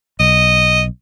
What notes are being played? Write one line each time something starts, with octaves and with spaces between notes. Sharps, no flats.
B1 D#5